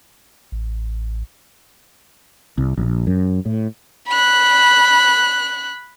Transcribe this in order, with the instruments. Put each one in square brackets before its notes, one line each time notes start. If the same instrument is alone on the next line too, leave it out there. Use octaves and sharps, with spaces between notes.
[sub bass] A1
[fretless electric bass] C2
A#1
F#2
A2
[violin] B5 F#6